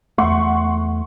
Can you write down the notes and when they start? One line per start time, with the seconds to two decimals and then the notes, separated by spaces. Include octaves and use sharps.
0.18 E2 A3 F#5 C6 C#6